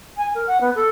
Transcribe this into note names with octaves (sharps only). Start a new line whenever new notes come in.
G#5
A#4
F#5
B3
A4